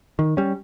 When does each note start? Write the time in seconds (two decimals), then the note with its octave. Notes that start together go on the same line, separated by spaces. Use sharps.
0.19 D#3
0.37 G3 C#4